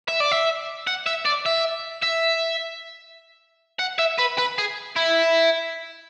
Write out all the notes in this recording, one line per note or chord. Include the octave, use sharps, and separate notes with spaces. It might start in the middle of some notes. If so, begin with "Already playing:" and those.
E5
D5
E5
F#5
E5
D5
E5
E5
F#5
E5
B4
B4
G#4
E4